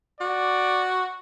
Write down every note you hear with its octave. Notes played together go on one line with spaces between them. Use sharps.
F#4 D5